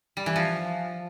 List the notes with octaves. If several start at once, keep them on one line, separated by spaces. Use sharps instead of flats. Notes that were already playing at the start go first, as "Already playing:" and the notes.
G3
E3
F3